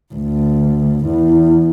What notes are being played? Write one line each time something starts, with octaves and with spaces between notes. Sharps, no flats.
D2
E2